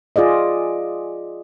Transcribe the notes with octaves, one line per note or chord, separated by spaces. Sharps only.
F4 G#4 D5 D#5